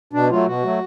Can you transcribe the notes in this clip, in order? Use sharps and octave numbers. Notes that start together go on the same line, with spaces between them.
B2 D4
F#3 A3 F4
B2 F#4
F#3 A3